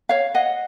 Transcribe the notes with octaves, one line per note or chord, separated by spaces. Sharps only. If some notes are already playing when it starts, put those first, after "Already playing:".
C#5 F5
D#5 F#5